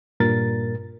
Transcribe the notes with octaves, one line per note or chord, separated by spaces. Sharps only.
G2 A#2 A#4 A6